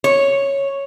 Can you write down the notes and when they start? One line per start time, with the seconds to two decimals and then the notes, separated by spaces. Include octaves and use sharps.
0.04 C#5